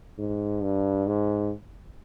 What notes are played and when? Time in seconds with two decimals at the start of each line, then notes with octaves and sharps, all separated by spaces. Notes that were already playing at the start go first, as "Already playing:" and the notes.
0.18 G#2
0.62 G2
1.06 G#2